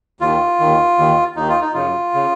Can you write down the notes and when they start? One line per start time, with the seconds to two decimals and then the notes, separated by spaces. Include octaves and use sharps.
0.21 D#2 D#3 F4
0.59 D#2 D#3
0.98 D#2 D#3
1.36 D#2 D#3 D#4
1.48 F4
1.61 D#4
1.74 F#2 C#3 F4
2.14 C#3